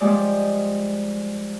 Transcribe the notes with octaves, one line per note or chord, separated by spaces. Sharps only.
F3 G3 G#3 D5